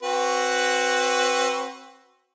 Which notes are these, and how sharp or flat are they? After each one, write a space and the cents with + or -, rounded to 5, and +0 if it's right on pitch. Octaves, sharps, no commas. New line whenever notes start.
C4 +25 F#4 +0 B4 +0